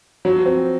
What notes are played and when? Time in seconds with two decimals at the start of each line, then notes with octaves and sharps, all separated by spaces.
0.25 F3 F#3
0.46 C4